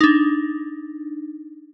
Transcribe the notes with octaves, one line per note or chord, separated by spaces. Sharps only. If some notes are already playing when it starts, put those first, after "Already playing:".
D4 D#4